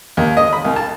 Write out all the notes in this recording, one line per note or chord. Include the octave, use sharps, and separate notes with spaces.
D#2
D#5
B5
C2
A5